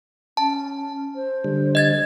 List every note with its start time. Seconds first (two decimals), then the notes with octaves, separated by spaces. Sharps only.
0.37 C#4 A5
1.15 C5
1.45 D3 G3
1.75 D#5 G#6 A6